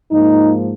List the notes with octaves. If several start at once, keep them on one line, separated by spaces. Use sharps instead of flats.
G#2 F3 A#3 D#4